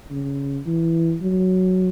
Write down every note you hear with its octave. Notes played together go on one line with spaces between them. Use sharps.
C#3
E3
F#3